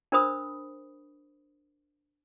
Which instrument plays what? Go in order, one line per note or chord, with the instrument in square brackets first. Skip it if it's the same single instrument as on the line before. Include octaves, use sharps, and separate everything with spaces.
[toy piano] D4 A#4 C5 B5 D#6